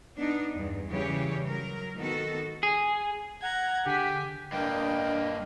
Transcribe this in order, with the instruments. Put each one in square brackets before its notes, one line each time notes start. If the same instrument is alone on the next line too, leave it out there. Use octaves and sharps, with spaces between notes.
[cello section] B3 D4 D#4
E2 G2
C#3 E3 G3 G4 C#5
F#3 A#4
D#3 B3 F#4 A4
[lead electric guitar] G#4
[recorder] F#5 [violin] A#5 G#6
[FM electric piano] D3 B6 [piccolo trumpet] G4 [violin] G#4
[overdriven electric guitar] G2 A#3 [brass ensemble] D4 A#4 D#5 [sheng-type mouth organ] G5